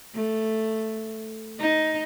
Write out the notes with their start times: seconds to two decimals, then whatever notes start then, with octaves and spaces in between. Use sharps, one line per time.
0.15 A3
1.59 D#4